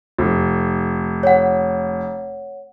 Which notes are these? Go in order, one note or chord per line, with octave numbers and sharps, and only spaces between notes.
F1
C#5 F#5